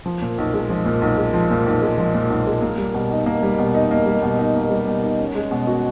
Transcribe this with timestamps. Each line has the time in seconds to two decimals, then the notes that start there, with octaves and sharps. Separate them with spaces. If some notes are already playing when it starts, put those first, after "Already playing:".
0.06 F3
0.22 A#2
0.38 B1
0.54 G#3
0.70 F3
0.85 A#2
1.02 B1
1.17 G#3
1.34 F3
1.50 A#2
1.66 B1
1.82 G#3
1.98 F3
2.14 A#2
2.30 B1
2.47 G#3
2.62 A#3
2.78 G3
2.94 B2
3.11 D#4
3.26 A#3
3.43 G3
3.58 B2
3.74 D#4
3.91 A#3
4.06 G3
4.22 B2
4.39 D#4
4.55 A#3
4.70 G3
4.87 B2
5.03 D#4
5.19 C#4
5.35 G#3
5.51 B2
5.67 F#4